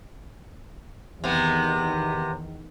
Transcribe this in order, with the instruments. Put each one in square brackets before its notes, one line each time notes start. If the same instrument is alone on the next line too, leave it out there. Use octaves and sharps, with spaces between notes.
[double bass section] E2 D#3 [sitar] C3 B3